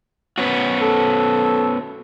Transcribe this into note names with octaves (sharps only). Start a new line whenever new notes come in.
B3 C#4 F#4
A4